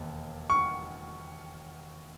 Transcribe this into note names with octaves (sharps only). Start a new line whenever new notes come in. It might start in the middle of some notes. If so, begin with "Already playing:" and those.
Already playing: E1 D#2
C#6